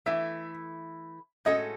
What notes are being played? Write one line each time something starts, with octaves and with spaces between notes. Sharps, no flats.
E3 A3 E4 E5
A2 G#3 C#4 F#4 A4 D#5